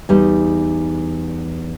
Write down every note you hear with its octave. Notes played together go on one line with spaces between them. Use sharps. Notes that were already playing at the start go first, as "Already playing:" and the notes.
E2 G3 D#4